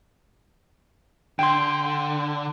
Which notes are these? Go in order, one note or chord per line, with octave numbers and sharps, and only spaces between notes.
D3 G5 C6